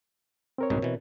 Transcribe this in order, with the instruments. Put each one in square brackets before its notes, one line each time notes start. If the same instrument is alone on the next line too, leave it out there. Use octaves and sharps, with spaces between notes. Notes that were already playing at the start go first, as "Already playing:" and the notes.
[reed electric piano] C4 A#4 C#5
[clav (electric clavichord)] C2 G#2 B2
B2 E3